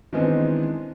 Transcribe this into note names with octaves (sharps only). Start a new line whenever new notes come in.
D#3 E3 G#3 B3 C4 D4